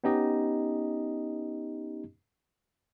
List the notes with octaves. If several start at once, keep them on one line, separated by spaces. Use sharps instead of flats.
B3 C#4 D#4 G4 D#5